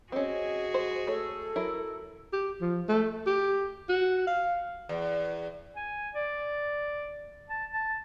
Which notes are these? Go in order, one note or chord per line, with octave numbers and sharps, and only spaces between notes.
C4 C#4 F#4 G#4 D#5
C5
A3 A4 C#5
F#3 E4 A#4
G4
F3
A3
G4
F#4
F5
E2
G#5
D5
A5
A5